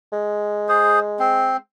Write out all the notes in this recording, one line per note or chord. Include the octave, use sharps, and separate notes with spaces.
G#3
G#4 C5
C4